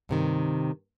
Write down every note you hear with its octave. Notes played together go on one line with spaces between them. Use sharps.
G2 C3 D#3